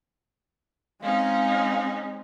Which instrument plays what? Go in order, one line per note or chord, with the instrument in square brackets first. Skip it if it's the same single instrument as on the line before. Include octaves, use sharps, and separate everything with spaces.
[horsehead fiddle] G#3 C4 [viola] C#4 D#4 [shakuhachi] F5